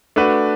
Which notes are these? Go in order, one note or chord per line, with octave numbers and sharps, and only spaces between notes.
A3 D4 F#4 B4